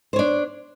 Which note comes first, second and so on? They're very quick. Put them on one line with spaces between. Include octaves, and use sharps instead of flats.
C5 C#5 D4